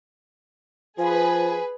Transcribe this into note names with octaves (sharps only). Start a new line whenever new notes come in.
F3 G#4 B4 G#5